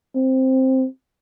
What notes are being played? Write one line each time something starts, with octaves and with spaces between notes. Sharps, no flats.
C4